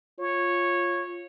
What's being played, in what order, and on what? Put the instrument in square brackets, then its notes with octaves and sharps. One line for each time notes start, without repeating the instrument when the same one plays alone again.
[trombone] F4 [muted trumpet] C#5